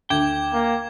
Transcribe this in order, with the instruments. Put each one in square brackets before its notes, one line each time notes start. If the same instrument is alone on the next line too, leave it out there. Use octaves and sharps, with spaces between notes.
[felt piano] D2 [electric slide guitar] G5 [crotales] D6 G#6
[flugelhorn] A#3